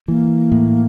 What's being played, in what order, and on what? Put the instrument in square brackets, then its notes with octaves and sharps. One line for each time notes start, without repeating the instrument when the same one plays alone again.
[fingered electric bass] E3 [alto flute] A#3
[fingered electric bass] A2